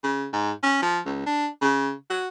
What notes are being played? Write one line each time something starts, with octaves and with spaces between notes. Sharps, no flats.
C#3
G#2
C#4
F3
C#2
D4
C#3
F#4